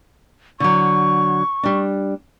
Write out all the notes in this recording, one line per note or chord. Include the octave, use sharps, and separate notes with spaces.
D3 F#3 C#6
G3 D4